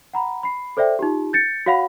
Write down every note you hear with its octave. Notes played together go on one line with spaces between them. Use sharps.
F#5 A#5 B5
B5 C7
A4 C5 D5 E5 G5
D#4 F4 G4
G6 A6 C#7
F#4 C#5 F5 F#5 B5